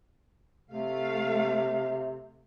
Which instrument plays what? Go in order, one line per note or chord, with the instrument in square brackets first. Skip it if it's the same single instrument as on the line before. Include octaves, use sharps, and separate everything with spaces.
[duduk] C3 [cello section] A3 F5